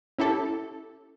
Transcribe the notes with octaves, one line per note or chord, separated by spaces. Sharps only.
C#4 E4 G4 A4